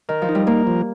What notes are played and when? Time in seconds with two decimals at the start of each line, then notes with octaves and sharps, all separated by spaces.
0.09 D#3 A#4
0.22 F3
0.29 D#4
0.35 G3
0.47 A#3 A#4
0.67 F3